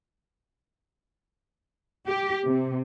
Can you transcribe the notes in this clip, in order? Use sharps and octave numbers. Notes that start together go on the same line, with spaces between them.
G4
C3